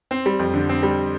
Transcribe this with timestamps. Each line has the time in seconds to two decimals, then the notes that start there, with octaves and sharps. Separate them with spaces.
0.11 C4
0.26 G3
0.39 F2
0.54 D3
0.69 C4
0.83 G3